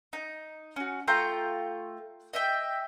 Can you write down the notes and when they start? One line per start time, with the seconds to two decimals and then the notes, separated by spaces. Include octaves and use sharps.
0.13 D#4
0.76 C#4 F#4
1.08 A3 F4 G5 A#5
2.33 D#5 E5 G5